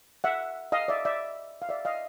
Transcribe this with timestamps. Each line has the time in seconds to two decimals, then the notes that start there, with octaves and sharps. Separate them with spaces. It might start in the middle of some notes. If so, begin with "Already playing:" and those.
0.24 E5 F#5
0.72 D#5 F5
0.88 D5 E5
1.05 D5 E5
1.62 F5
1.69 D5 E5
1.85 D#5 F5